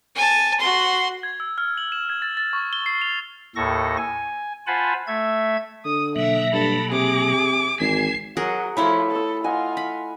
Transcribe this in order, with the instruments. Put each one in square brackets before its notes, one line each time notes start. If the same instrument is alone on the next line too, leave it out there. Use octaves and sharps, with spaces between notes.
[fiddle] G#5 A5
F#4 C6
[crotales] G#6
E6
F6
F#7
E7
G#6
A6
A6
C#6
G7
C7
F7
[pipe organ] D#2 A2 A4 C#6 A#6
G#5
F4 C5 F#5 G#5 A5 B5
A3 E5 G#6
[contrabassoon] D3 [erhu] D#6
[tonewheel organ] B2 F#3 A#3 [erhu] E5
[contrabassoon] G2 [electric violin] A4 [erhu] B5
[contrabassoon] C3 [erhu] G#4 [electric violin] D6
[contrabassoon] G#1 [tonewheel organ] E3 G#5 [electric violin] C7
[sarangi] F#3 [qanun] G#4 A#4 F#5
[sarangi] F3 [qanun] A3 E4 C#5 [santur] B5
[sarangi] A4 [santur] D#6 E6
[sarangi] F4 [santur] D#5 F#5 G#5
[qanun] B5